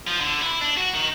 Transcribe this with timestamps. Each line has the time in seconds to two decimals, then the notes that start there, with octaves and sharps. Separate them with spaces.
0.07 F3
0.21 D3
0.42 E4
0.62 D4
0.77 F#4
0.93 D#3